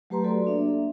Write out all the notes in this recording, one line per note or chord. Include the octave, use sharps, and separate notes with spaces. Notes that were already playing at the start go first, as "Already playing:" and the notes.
F#3 A3 G4 B4 A#5 C6
F#4 A4 D5
A#3 D4 E5